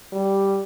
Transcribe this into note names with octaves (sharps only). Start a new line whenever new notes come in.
G3